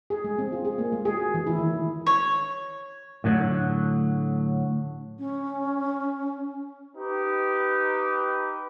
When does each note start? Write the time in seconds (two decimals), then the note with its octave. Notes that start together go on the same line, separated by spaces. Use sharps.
0.10 G#4
0.24 G#3
0.38 C4
0.52 F4
0.65 G#4
0.78 A#3
0.92 G#3
1.05 G#4
1.17 F#4
1.34 E3
1.47 E4
1.58 D#3
2.06 C#5
3.24 A2 D3 F#3
5.19 C#4
6.96 D#4 G4 B4